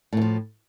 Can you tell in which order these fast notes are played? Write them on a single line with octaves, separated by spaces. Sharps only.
A2 E3 F3